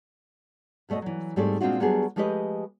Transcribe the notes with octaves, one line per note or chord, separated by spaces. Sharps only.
D2 B2 A3 D5 D#5
E3 F#3
G#2 G3 A3 C4 G#4 D5
A#2 G#3 C4 D4 F4 F#4
F#3 G3 A3 B3 D4 G#4
F3 G#3 A3 G4 B4 D#5